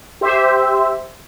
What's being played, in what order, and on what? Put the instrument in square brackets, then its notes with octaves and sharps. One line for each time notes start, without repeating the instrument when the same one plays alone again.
[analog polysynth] G4 C5 E5